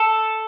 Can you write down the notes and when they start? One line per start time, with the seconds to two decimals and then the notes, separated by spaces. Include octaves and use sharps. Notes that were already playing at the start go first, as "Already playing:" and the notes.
Already playing: A4